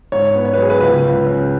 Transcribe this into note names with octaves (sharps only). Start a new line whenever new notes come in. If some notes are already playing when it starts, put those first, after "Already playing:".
G#2 C#5
B3
C#5
B4
F#3
G#4
B4
C#2 B4
C#2
C#3